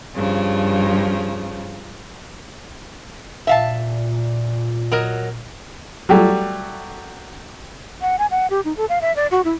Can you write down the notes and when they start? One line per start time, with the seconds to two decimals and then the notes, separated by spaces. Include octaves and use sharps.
0.14 G2 C#3 F3
3.47 A#2 E5 F5 A5
4.92 F#3 A#4 D#5
6.09 F#3 G3 A3
8.02 F#5
8.19 G#5
8.31 F#5
8.50 G4
8.65 D#4
8.77 A4
8.89 F5
9.02 E5
9.16 D5
9.31 F#4
9.45 E4